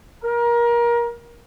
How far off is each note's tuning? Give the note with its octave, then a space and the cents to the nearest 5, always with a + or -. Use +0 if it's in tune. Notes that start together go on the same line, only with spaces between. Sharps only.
A#4 +25